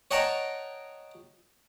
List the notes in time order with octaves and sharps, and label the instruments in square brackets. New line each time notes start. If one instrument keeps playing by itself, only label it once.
[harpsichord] C#5 D#5 F#5 G5 A5 A#5